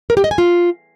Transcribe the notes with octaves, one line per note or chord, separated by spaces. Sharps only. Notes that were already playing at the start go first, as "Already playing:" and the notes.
A#4
G4
D#5
G#5
F4